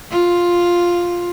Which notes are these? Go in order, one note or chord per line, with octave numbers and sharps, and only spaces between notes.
F4